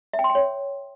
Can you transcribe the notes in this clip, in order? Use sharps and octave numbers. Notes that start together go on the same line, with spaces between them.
E5
G5
C6
G5
C#5